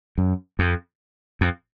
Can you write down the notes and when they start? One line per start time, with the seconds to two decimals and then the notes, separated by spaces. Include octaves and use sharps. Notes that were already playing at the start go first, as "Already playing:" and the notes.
0.18 F#2
0.59 F2
1.41 F2